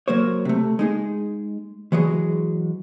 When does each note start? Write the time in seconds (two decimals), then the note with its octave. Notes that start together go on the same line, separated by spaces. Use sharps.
0.08 F#3 A#3 C5 C#5
0.45 C3 A3
0.79 G#3 D#4 G#4
1.92 E3 F#3 G#3 G#4